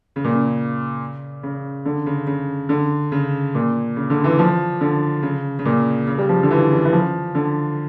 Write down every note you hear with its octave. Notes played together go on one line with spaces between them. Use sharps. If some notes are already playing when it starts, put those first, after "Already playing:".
C#3
A#2
C#3
C#3
D3
C#3
C#3
D3
C#3
A#2
C#3
D3
E3
F3
D3
C#3
C#3
A#2
C#3
G3
F3
D3
E3
C#3
E3
F3
D3